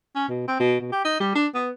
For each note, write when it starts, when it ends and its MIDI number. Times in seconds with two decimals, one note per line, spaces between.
0.15 0.26 61
0.29 0.44 47
0.48 0.58 60
0.60 0.78 47
0.80 0.88 47
0.92 1.04 67
1.05 1.15 63
1.20 1.33 55
1.35 1.47 62
1.54 1.70 59